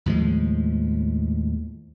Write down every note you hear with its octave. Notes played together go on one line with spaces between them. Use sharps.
D#2 A2 F3 G#3